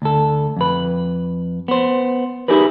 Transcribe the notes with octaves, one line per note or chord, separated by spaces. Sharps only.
D2 A4
F2 B4
B3 C5
D#4 E4 G4 G#4 A#4 B4